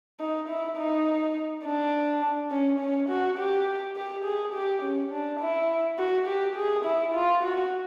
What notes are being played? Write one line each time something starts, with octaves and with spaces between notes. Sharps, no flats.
D#4
E4
D#4
D4
C#4
C#4
F#4
G4
G4
G#4
G4
C#4
D4
E4
F#4
G4
G#4
E4
F4
F#4